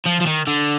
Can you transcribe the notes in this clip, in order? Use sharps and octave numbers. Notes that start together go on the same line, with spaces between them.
F3
F3
D#3
D3